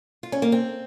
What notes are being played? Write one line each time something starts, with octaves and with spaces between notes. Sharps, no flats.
F4
C#4
A#3
C4